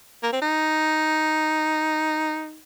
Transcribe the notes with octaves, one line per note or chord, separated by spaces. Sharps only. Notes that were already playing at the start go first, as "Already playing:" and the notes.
A#3
C4
D#4